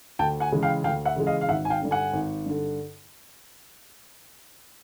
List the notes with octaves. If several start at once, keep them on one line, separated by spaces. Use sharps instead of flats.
D2 G5 A5
F#5 G#5
C#3 E3 G#3
F5 G5
D2 F5 G5
E5 F#5
C#3 E3 G#3
D#5 F5
F5
G#1 E5 F#5
G#5
F5 G5
G2 D3
F#5 G#5
G#1
G2 D3